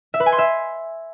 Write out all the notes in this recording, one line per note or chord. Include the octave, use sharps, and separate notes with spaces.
E5
B4
G#5
C6
E5